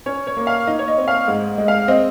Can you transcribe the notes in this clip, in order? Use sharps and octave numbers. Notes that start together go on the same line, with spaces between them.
C#4 C#5
C#5
A#3
F5
D#4 D#5
C#5
D#5
C4
F5
G#2
G#3
F5
C4 D#5